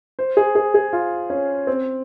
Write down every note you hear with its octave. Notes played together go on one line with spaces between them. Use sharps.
C5
G#4
G#4
G#4
F4
C#4
C4